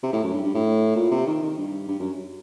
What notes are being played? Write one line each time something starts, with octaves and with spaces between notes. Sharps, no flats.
C3
A2
F#2
G2
G2
A2
A#2
C3
D#3
D#3
G2
G2
F#2